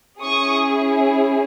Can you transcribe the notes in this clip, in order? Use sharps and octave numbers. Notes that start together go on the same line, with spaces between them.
C#4 E4 G#4 C#6 D#6